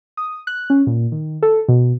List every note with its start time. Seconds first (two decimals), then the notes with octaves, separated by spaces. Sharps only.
0.17 D#6
0.47 F#6
0.70 C#4
0.87 A#2
1.12 D#3
1.42 A4
1.68 B2